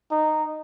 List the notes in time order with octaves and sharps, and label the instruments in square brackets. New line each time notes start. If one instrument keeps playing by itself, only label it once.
[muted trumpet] D#4